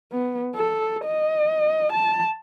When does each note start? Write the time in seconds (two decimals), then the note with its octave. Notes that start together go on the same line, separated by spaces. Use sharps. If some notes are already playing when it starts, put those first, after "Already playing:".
0.12 B3
0.56 A4
1.05 D#5
1.93 A5